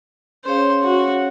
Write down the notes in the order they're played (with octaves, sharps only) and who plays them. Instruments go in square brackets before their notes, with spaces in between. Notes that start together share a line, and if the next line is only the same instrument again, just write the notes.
[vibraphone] C#4 G#4 C#5 F5 [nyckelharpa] C5
[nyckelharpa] F#4